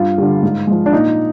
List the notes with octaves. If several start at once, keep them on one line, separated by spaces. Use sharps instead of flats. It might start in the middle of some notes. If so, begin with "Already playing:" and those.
Already playing: G2 F4
D3 G3
G#2
F3 G#3
D4
A#2 D#4